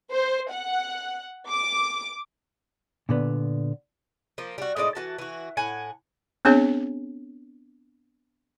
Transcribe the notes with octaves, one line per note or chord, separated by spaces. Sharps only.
C5
F#5
D6
A#2 D3 B3
F3 A#3
G3 F#4
A2 G#3 D#4 D5
E3 F#4 A5
E3 F#4
A2 F#5 G#5
B3 C4 D4 G#4 C#5